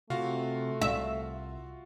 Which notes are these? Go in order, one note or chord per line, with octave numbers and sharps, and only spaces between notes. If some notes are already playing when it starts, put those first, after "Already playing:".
C3 A3 F4 F#4 F5
C2 E5